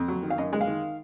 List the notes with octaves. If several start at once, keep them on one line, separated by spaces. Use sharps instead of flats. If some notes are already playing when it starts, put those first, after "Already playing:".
Already playing: F2
F#3
D#3
F5
F#2 D#5
G#3
F5
D#3